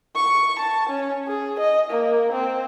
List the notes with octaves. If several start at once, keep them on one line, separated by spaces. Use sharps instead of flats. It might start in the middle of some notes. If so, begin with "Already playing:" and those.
C#6
A5
C#4
G#4
D#5
A#3
C4